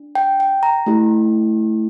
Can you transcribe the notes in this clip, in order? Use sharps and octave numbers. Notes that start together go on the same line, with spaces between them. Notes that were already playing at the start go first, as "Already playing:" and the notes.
Already playing: D4
G5
G5
A#5
A3 E4 G4